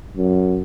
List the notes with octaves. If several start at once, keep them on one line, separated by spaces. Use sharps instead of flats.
F#2